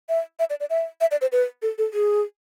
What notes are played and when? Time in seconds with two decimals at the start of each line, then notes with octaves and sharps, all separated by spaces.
0.09 E5
0.39 E5
0.50 D5
0.60 D5
0.70 E5
1.01 E5
1.11 D5
1.21 C5
1.32 B4
1.62 A4
1.78 A4
1.93 G#4